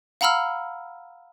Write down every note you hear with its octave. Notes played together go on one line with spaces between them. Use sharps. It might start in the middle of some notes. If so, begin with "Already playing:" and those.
F5 F#5 A#5 B5 E6 F6